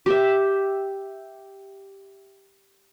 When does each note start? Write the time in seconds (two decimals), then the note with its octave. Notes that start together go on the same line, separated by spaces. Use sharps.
0.06 G4 E5